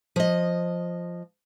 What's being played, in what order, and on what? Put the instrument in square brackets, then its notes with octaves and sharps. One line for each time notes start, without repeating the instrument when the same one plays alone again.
[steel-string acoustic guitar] F3 D#5